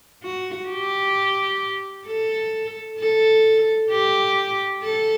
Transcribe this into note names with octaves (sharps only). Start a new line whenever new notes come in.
F#4
G4
A4
A4
G4
A4